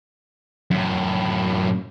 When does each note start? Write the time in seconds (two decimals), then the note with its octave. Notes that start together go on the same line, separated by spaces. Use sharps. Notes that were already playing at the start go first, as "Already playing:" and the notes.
0.71 F#2 A2